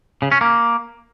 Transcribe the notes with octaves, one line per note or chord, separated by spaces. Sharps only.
C#3
C#4
A#3